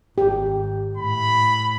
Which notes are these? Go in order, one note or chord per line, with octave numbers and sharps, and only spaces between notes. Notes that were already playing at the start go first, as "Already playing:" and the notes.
G#1 G4
A2 B5